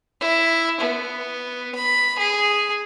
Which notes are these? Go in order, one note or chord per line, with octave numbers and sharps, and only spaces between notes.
E4
B3
B5
G#4